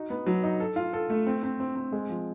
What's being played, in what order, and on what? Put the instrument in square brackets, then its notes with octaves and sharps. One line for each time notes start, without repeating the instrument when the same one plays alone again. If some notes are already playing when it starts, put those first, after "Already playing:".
Already playing: [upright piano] D#4 F#4
B3
F#3
D#4
A4
F4
A4
A3
C4
C4
C4
C4
G#3
F3